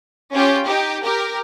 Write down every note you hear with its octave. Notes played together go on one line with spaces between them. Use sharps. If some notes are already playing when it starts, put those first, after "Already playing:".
C#4 F4 G4 G5
D#4 G4
G4 A#4